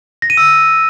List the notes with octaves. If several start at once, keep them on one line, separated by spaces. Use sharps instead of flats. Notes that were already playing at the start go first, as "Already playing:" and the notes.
A#6
D#7
E6